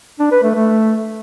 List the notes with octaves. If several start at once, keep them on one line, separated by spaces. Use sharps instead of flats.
D4
B4
A3
A3